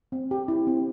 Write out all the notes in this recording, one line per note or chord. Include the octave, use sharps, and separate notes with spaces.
C4
G4
E4
C4